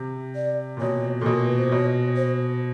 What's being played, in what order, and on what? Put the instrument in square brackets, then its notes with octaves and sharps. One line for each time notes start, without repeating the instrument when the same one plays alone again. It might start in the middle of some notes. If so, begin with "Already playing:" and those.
Already playing: [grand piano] C3
[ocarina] D5
[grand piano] A#2
[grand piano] B2 [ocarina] C#5
[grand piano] A#2 [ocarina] A4
[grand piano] B2
[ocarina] A#4
B4
C5
[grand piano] B2 [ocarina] C#5
[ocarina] C5